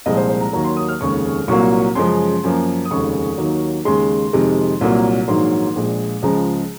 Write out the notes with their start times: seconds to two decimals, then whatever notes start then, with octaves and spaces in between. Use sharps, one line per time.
0.06 C2 A#2 F3 G#3 D#5
0.17 C5
0.30 C5
0.41 A#5
0.53 D#2 D#3 F#3 A#3 A#5
0.64 C6
0.77 D#6
0.88 F6
1.00 F1 D#2 C#3 G#3 C#6
1.48 C2 A#2 F#3 A#3 C#6
1.95 F#2 C#3 F3 G#3 C6
2.44 F#2 F3 A#3
2.85 D#6
2.91 F1 D#2 C#3 G#3 C#6
3.38 D#2 D#3 F#3 A#3
3.85 D#2 C#3 G#3 C6
4.33 F2 C3 D#3 G#3
4.81 C2 A#2 F#3 A#3
5.28 A#1 G#2 D#3 F#3 A#3 C6
5.76 A#1 A#2 G#3
6.22 C#2 C#3 F3 G#3 A#5